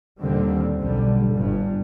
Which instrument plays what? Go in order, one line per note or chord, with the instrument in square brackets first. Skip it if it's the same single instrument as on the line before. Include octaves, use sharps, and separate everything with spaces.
[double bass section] D#2 A#2 D3 D#3 G3 C4
B1 D3 G3
G1 G2